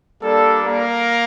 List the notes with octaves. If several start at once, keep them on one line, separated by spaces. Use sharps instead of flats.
G3 A#3 D4 A4
A#3 A#4